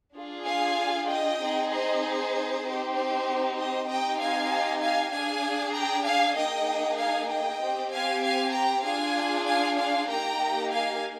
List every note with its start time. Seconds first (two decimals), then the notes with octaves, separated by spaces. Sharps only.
0.14 D4 F4 G#4
0.45 F5 G#5
1.08 D#5 G5
1.38 C4 D#4 G#4
1.70 C5 D#5
2.01 C5
2.63 C4 D#4 G4
2.94 C5
3.56 C5 D#5
3.87 C4 D#4 G4 D#5 G5
4.18 F5 G#5
4.80 F5 G#5
5.11 D4 G#4 F5 G#5
5.73 G5 A#5
6.05 F5 G#5
6.35 A#3 D#4 G#4 D#5 G5
6.97 F5 G#5
7.29 D#5 G5
7.60 C4 G4
7.91 F5 G#5
8.22 F5 G#5
8.53 G5 A#5
8.83 D4 F4 G#4 F5 G#5
9.46 F5 G#5
9.77 F5 G#5
10.08 A#3 D#4 G4 G5 A#5
10.70 F5 G#5